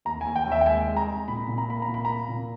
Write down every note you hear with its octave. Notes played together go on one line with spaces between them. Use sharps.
D#2 A#5
D#2 G#5
G5
D#2
E5
G5
G#3 G#5
G#3
A#5
G#3
A#2 B5
A#2
A#5
A#3 B5
A#5
A#2
B5
A#3 A#5
A#2